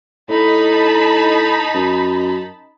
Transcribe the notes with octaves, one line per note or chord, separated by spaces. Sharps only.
A2 D#4 A5 B5
F#2